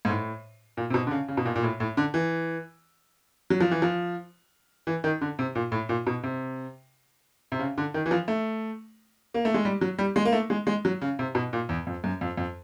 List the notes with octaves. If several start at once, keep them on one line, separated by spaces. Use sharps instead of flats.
G#2
A2
A#2
C3
B2
D3
C#3
C#3
B2
A#2
A#2
A2
A2
D3
E3
F#3
F3
E3
F3
E3
D#3
D3
C3
A#2
A2
A#2
B2
C3
C3
C#3
D3
D#3
E3
F3
A3
A#3
A3
G#3
G3
F#3
G3
G#3
A#3
A3
G#3
G#3
F#3
C#3
C3
B2
A#2
E2
F2
F#2
F2
F2